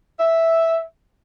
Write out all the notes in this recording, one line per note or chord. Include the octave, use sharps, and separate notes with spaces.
E5